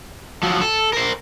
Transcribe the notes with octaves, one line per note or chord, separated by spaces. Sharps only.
F3 F#3
A4
A#4 C5